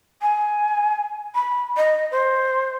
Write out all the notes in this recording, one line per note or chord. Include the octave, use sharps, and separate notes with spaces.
G#5
B5
D#5
C5